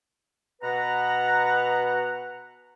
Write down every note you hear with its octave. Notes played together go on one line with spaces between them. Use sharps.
B2 B4 F#5 A#5